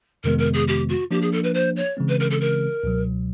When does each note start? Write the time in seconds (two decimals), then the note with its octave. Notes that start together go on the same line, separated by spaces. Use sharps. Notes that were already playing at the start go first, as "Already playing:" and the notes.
0.24 F2 C3 D#3 G#3 B3 A#4
0.38 A#4
0.53 G#4
0.67 G4
0.88 F#4
1.10 F3 A#3 D4 G4
1.21 G#4
1.32 A4
1.43 B4
1.54 C5
1.76 C#5
1.97 C#3 E3 G#3 C4
2.08 B4
2.19 A#4
2.30 A4
2.40 A#4
2.83 C#2 B2 F#3